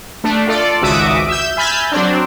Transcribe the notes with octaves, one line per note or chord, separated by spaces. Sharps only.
A3 D4
F4 A4 D5
G#1 C#2 F#4 E5 D6 D#6
E5 E6 G6
E5 G#5 B5 F6 G6 A6
F#3 C4 D4